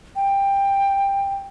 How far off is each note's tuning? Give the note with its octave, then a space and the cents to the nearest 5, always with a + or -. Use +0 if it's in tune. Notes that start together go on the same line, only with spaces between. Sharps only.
G5 +15